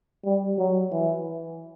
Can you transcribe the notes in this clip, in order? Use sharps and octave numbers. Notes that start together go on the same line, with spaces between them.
G3
F#3
E3